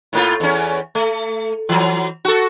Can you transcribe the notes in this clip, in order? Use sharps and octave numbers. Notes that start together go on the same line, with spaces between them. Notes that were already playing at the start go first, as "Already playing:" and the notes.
A2 A#3 F4
E2 C#4
A3
E3 F#3
F#4 A4